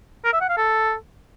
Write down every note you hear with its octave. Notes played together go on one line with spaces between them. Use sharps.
A#4
E5
F#5
F5
A4